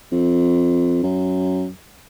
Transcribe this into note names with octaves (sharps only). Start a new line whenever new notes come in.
F2
F#2